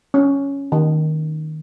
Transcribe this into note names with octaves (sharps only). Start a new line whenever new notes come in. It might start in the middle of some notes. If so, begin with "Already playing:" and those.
C#4
D#3